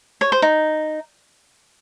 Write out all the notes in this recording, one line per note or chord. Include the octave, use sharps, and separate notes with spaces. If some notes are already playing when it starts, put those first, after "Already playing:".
C#5
C5
D#4